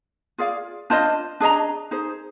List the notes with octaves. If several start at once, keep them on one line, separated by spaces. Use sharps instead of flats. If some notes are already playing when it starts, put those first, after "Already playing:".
F4 G#4 D5 F5
D4 F4 C5 D#5
D4 G#4 D#5 A#5
D#4 G#4 C5